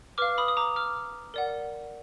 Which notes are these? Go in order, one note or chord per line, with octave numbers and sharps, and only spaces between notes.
B4 F5 D6 F6
B5 D#6
D#6
A#5 D6
D6 F6
A#4 D5 F#5